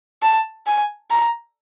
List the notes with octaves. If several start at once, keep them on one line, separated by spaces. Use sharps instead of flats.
A5
G#5
A#5